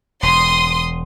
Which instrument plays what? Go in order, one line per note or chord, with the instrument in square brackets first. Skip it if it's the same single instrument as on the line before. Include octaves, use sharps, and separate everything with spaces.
[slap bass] E1 [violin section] C6 D#6